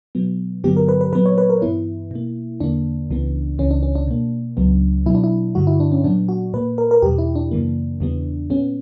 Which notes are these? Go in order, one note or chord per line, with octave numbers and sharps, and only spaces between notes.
B2 F#3 B3
G2 D3 F#3 B3 G4
A#4
B4
B4
A#2 F#3 B3 B4
C#5
B4
A#4
G2 E3 B3 E4
B2 A#3
E2 D3 A#3 D4
C#2 C#3 E3 B3
C#2 C#3 E3 C#4
D4
C#4
D4
B2 A#3
C#2 C#3 F#3 B3
B2 F#3 B3 E4
D4
E4
G2 D3 G3 F#4
E4
D4
C#4
A#2 F#3 B3 D4
F#4
A#2 A#3 B4
A#4
A#4
E2 B2 G3 G4
E4
D4
F#2 C#3 E3 A#3
E2 C#3 E3 G3 B3
A#2 G3 B3 C#4